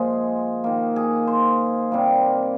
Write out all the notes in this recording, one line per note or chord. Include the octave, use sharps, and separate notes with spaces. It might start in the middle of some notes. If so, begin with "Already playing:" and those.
Already playing: A#2 F3 G#3 G#4
D#3 A#3
G#4
C5
C3 G3 A#3